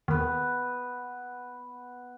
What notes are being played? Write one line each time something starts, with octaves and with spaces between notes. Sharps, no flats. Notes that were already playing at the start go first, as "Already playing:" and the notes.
D#2 B3 B4